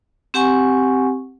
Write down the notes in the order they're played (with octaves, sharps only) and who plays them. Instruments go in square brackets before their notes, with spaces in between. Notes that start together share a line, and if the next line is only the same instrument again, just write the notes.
[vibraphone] C4 G4 F#5 G#5 C#6